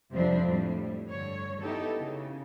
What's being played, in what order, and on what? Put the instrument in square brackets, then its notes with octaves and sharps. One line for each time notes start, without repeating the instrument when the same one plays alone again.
[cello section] F2 C3 F3 G3 C4 D4
A2 G3
G2 D3 C#5
B3 D#4 E4 G4 A4
C#3